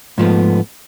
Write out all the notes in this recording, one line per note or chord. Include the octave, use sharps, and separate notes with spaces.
G#2 F3 A3 B3